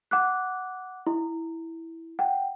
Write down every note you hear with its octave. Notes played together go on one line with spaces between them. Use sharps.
F#5 D6 F#6
E4
F#5 G5